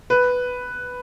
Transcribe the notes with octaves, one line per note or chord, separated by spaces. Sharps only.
B4